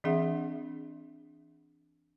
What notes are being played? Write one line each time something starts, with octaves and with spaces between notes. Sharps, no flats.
E3 C4 D4 G#4 E5 F#5